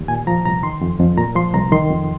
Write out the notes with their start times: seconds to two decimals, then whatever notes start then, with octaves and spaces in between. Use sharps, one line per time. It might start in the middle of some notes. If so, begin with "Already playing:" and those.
Already playing: D#2
0.08 A#2 G#5
0.27 F3 A#5
0.45 C2 A#5
0.63 D#3 C6
0.81 F2
1.00 F2
1.18 A#2 A#5
1.35 F3 C6
1.54 C2 A#5
1.72 D#3 C6
1.91 F2